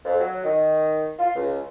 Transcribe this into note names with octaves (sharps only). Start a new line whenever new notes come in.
F2
F#3
D#3
F4
C#2